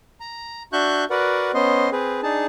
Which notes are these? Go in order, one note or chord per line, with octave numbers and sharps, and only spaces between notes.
A#5
D4 F#4 E5 C#6 F#6 G6
F#4 A#4 B4 D5 F#5
B3 C#4 C5 D#5 C6
C4 G#4 B4
D4 D#4 G#4 A5